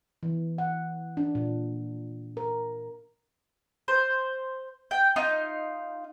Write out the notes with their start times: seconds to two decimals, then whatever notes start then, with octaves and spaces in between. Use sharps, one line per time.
0.23 E3
0.58 F#5
1.17 D4
1.35 A#2
2.37 A#4
3.88 C5
4.91 G5
5.16 D#4 F4 F5